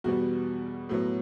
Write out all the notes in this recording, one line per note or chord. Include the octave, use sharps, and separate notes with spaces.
E2 B2 G3 B3 F#4
A2 F#3 B3